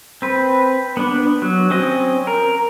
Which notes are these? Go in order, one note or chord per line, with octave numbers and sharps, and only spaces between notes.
C4 B4
B3 D4
F#3
C4 C#4 D#5
A#4